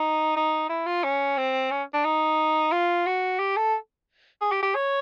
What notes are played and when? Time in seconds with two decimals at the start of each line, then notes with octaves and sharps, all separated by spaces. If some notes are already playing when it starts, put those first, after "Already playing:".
Already playing: D#4
0.36 D#4
0.69 E4
0.86 F4
1.04 C#4
1.37 C4
1.71 C#4
1.94 D4
2.05 D#4
2.72 F4
3.06 F#4
3.39 G4
3.57 A4
4.41 G#4
4.51 G4
4.63 G4
4.75 C#5